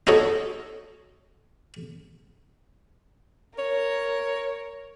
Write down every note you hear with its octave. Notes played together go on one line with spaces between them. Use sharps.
D#4 F#4 A4 C#5 D#5
A#4 C#5